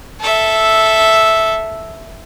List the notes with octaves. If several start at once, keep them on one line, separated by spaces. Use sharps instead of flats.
A4 E5